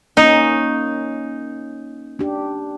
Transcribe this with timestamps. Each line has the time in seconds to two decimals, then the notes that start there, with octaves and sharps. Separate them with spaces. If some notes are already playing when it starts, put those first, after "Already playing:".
0.17 A#3 C#4 D#4
2.19 D4 G4